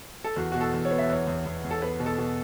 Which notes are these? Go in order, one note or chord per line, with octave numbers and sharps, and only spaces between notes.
A4
E2 F#4
B2 F#4
A4
E2
C#5
B3
E5
E2 C#5
E2
E2
E2
A4
B3 B4
B2
A4
B2